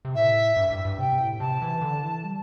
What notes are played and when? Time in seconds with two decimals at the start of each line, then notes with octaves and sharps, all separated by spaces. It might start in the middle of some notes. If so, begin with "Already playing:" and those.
0.05 C3
0.15 A2 E5
0.57 G2
0.70 G2
0.85 G2
0.99 C3 G5
1.20 A2
1.40 C3 A5
1.62 E3
1.82 D3
2.02 E3
2.24 G3